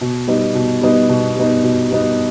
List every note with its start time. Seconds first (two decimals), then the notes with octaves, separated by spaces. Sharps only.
0.01 B2
0.28 G3 B3 D#4
0.55 B2
0.82 G3 B3 D#4
1.09 B2
1.37 G3 B3 D#4
1.64 B2
1.91 G3 B3 D#4